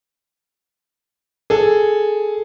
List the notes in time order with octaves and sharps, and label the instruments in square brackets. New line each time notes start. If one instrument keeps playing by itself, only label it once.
[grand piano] G#4 A4